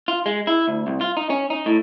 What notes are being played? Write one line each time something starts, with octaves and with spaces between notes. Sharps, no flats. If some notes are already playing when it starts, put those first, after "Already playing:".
F4
G#3
E4
D2
C2
F4
D#4
C#4
D#4
A2